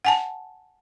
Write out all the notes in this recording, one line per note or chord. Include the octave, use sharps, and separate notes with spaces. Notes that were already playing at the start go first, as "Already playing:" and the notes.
F#5 G#5 A5